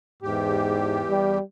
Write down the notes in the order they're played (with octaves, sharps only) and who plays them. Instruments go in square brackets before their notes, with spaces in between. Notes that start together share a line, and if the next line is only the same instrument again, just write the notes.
[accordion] E2 G4 [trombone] G#2
[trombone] G3